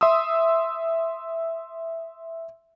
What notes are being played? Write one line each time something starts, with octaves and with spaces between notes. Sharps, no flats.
E5 C6 D#6 E6